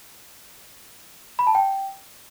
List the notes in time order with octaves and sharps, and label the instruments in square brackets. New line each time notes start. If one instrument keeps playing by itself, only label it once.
[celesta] B5
A5
G5